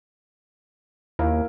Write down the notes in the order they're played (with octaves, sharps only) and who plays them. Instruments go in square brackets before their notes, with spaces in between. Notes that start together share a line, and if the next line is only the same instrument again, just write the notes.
[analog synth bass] D#2 [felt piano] E4 A#4 F5